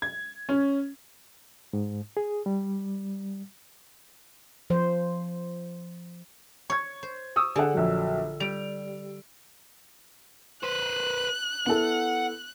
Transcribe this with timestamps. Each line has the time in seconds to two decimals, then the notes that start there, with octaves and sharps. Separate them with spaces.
0.02 G#6
0.49 C#4
1.73 G#2
2.17 G#4
2.46 G3
4.70 F3 C5
6.70 C#5 C#6 G#6
7.03 C5
7.36 C#6 D#6 E6
7.56 D3 G#4 F#5
7.74 A#1 F#3
8.40 G3 D7 F7
10.63 B4 C5 F#6
11.66 B3 E4 A4 F#5